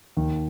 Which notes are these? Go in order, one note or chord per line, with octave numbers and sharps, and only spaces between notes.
D#2 D#3